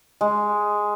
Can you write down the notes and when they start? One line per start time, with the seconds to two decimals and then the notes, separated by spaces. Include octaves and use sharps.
0.21 G#3